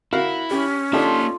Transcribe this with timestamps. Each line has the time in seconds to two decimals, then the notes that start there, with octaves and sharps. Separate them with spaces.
0.13 E4 F#4 A#4 F5
0.51 C#4 G4
0.93 A#3 D4 D#4 F4 G4 A4 D5 A5